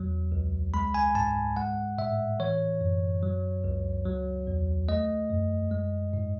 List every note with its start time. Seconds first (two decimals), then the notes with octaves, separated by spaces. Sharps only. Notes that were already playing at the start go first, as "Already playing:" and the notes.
Already playing: E2 F#3
0.32 C#2
0.74 G#3 B5
0.94 G#5
1.15 G#2 A5
1.57 G#3 F#5
1.98 A2 E5
2.39 E3 C#5
2.81 F#2
3.23 F#3
3.64 C#2
4.05 F#3
4.47 E2
4.88 A3 D#5
5.30 F#2
5.71 G#3
6.13 G#2